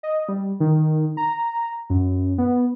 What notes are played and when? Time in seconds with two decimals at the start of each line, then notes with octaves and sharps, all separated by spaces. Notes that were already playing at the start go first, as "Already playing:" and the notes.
0.03 D#5
0.29 G3
0.60 D#3
1.17 A#5
1.90 F#2
2.38 B3